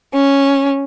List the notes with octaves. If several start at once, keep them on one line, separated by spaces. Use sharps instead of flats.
C#4